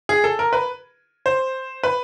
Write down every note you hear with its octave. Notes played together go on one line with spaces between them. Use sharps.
G#4
A4
A#4
B4
C5
B4